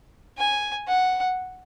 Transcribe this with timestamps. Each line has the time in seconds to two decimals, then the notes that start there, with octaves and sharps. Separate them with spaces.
0.38 G#5
0.88 F#5